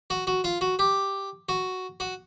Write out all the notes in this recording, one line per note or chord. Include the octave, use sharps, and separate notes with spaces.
F#4
F#4
F4
F#4
G4
F#4
F#4